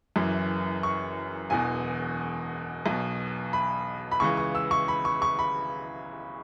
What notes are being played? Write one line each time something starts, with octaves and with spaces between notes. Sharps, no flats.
F#1 F#2 E3
C#6
E1 E2 B2 G#5
B1 B2
B5
B5
C#2 C#3 E3 C#6
C#6
E6
C#6
B5
C#6
C#6
B5